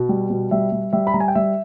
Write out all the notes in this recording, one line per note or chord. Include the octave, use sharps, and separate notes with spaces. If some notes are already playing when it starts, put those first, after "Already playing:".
Already playing: B2
G3
B2
G3 E5
G3
G3 E5
B5
G3 A#5
G#5
G5
G3 E5